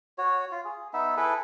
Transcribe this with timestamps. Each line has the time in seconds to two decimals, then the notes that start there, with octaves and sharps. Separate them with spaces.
0.18 F#4 C#5
0.52 F4
0.65 G#4
0.93 B3 D#4 E5
1.17 E4 G#4 A4 B4